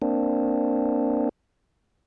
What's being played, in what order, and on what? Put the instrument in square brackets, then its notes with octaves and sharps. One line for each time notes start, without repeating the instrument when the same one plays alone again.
[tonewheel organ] A#3 C4 D4